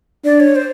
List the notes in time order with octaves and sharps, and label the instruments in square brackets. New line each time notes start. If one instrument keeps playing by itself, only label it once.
[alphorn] D4 [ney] D5
[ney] C#5
C5